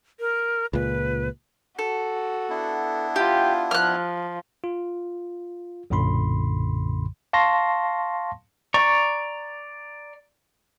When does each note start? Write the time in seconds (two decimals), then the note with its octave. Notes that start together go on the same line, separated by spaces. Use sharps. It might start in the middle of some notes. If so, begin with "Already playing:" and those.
0.20 A#4
0.73 C#2 A#2 B4
1.79 F#4 A4
2.50 B3 D4 E4
3.16 F4 G4
3.71 F3 F6 F#6
4.64 F4
5.90 B1 F#2 A#2 D3 B5 C6
7.33 F5 A5 C6 C#6 A#6
8.74 D5 A#5 C#6